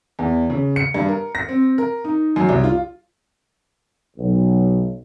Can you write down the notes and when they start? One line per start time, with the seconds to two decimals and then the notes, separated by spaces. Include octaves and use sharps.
0.19 E2
0.50 C#3
0.76 C#7
0.94 G2
1.08 A#4
1.35 A#6
1.49 C4
1.78 A#4
2.04 D#4
2.36 F#2
2.49 C2
2.64 F4
4.17 B1